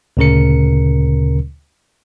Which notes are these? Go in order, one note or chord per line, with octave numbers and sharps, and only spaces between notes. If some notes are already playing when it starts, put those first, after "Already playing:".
D2 A#2 C#3 C#4 A#4 C#7